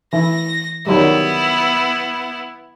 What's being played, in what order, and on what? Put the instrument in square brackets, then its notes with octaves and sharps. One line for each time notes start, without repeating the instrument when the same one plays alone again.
[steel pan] E3 E4 [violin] A#6
[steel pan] D#3 F#3 G3 [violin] B3 E4